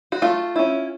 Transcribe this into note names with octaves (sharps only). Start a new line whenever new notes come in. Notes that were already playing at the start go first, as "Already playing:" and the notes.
F#4
A3 F4
C#4 E4